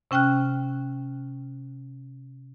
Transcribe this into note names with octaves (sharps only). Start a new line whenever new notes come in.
C3 C#4 G5 F6 F#6